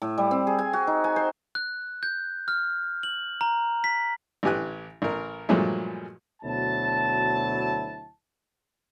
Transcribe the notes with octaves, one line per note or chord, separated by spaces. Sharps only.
A2
G3
C4
G#4
G#5
F#4
D#4
G#5
C5
F#6
G6
F6
F#7
A#5
B6
A1 E3 G4 G#5 F#6
A1 A#4
G2 A#2 F3 F#3 G#3 A3
D2 B2 F#3 E4 A5